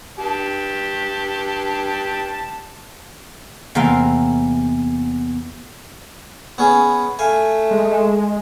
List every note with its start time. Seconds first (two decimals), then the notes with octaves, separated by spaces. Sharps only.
0.19 G4 A5
3.75 E2 C3 A#3 F5 C6
6.58 B3 C#4 G#4
7.19 A3 F5 G#5
7.71 G#3